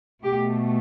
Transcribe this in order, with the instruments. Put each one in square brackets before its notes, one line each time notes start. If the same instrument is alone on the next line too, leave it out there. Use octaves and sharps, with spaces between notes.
[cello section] B2 A3 G4